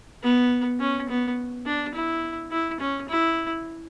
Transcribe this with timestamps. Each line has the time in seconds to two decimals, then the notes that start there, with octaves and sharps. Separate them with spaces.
0.23 B3
0.80 C#4
1.09 B3
1.66 D4
1.94 E4
2.51 E4
2.80 C#4
3.09 E4